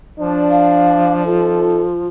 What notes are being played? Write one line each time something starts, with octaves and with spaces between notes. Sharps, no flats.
F3 D4
F5
C4 D#4 F4 A4